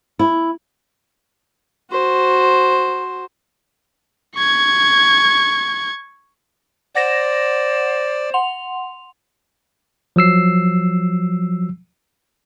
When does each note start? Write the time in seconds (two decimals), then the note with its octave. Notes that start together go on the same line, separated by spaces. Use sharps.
0.19 E4
1.91 F#4 C5
4.35 C#6 G#6
6.95 C5 D5 F#5 A#6 E7
8.34 F#5 C6 F7
10.16 F3 F#3 E6 C7